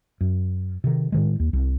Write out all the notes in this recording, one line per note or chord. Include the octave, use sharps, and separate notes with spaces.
F#2
C3 D#3
A2 D#3 G#3
D#2
C2